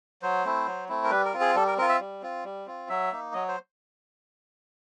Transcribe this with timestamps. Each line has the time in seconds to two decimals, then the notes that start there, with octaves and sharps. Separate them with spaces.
0.22 F#3 C5
0.44 A3 C4 E4
0.66 F#3
0.89 A3 C4 E4
1.04 A#4
1.11 G3 B4
1.25 A#4
1.34 C4 F4
1.41 G#4
1.55 G3 A4
1.67 A#4
1.77 C4 A#4
1.81 F4
1.89 E5
2.00 G3
2.22 C4 F4
2.44 G3
2.66 C4 F4
2.89 F#3 E5
3.12 A#3 D#4
3.33 F#3 D#5
3.48 C5